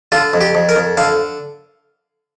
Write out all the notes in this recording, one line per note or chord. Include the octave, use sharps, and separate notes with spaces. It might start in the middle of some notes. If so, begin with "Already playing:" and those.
D3 F4
F2
G4
F2
A#4
F2
D3 F5